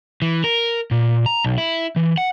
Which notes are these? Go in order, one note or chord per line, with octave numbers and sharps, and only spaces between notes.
E3
A#4
A#2
A#5
B1
E4
E3
F#5